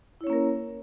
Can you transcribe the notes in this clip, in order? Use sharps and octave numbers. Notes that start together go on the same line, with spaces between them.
A#3 C#4 E4 A#4 C#5